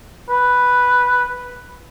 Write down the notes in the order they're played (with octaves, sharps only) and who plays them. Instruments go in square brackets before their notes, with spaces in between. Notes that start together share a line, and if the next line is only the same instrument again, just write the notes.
[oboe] B4